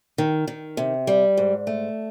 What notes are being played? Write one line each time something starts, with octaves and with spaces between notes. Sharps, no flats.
D#3
D#3
C3
G3
G#2
A3